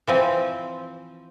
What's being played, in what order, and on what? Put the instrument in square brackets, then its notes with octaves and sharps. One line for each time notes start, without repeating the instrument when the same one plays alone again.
[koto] E3 F3 C4